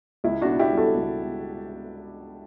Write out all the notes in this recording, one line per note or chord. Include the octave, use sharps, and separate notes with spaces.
C#2 E4
D4 F#4
B2
E4 G4
G3
F#4 A4
C#2